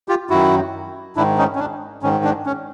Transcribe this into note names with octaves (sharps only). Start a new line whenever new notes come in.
F4 G4
F#2 D#3 E4 F#4
G#2 D#3 D4 E4
C#4 D#4
C#4
D4
G#2 D#3 C#4
D4
C#4